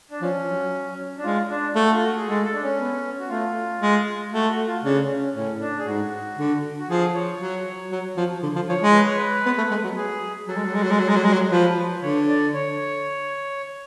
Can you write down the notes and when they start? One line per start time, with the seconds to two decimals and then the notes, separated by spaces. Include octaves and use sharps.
0.11 D4
0.22 F3 C#4
0.48 F#3
1.18 D4
1.24 G#3 F4
1.50 D4
1.76 A3 F#4
1.92 F4
2.04 F#4
2.16 G#4
2.27 G#3 A4
2.44 A4
2.53 D4
2.62 C#4
2.79 B3
3.20 F#4
3.29 A3 F4
3.81 G#3
4.32 A3 F#4
4.49 F#4
4.67 F4
4.84 C#3 D4
5.01 C#4
5.17 C#4
5.35 A2 C#4
5.61 D4
5.79 G#4
5.86 G#2 F#4
6.38 D3
6.79 F#4
6.89 F3 G#4
7.14 C#5
7.41 F#3
7.92 F#3
8.17 F3
8.43 D3
8.56 F3
8.69 F3 C#5
8.81 G#3
8.95 B4
9.05 C#5
9.16 B4
9.46 B3
9.58 A3
9.71 G#3
9.84 F#3
9.96 G#4
10.48 F#3 A4
10.56 G#3
10.65 F#3
10.74 G#3
10.83 F#3
10.91 G#3
10.99 F#3
11.08 G#3
11.16 F#3
11.24 G#3
11.33 F#3
11.50 F3 B4
12.02 D3 C#5
12.29 D5
12.54 C#5